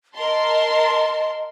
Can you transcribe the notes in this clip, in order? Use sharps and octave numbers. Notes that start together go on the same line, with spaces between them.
A#4 D#5 A5 C6